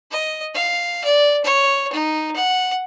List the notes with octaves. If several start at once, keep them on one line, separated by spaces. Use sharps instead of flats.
D#5
F5
D5
C#5
D#4
F#5